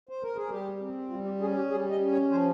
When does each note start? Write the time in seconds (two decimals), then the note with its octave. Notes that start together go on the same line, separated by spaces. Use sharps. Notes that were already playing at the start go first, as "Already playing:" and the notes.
0.09 C5
0.23 A#4
0.36 G#4
0.50 G3 G4
0.80 C4
1.10 G3 F4
1.25 G4
1.40 C#4 G#4
1.55 G4
1.70 G3 G#4
1.90 D#5
2.01 C#4
2.11 C#5
2.30 F3 C5